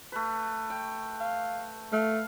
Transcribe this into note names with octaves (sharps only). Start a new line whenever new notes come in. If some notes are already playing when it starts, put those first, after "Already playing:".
A3 B4
G5
F5
A3 F5